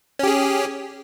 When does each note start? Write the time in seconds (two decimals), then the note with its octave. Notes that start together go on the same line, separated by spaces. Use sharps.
0.19 C#4
0.23 G4
0.27 G#4